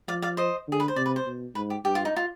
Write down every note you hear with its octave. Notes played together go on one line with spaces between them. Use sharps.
F3 D5 F5
D5 F5
C5 D#5
D3 G#4
B4
C5
C3 D5
B4
C5
B2
G#2 B4
G4
G2 G4
F4
D#4
F4